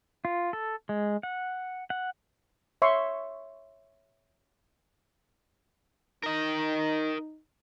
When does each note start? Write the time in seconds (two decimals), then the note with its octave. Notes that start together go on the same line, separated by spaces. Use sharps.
0.25 F4
0.53 A4
0.89 G#3
1.23 F#5
1.90 F#5
2.82 C#5 E5 C6 C#6
6.23 D#4 A#4 D#5